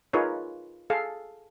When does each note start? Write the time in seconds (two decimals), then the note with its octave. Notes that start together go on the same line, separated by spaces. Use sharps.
0.13 D#4 F4 G#4 A#4 B4 C#5
0.90 G#4 A4 F5